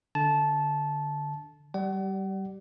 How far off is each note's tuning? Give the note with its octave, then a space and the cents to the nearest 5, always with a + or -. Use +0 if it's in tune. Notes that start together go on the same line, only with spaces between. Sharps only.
D3 +0 A5 -15
G3 -20 D5 +0 F#5 +40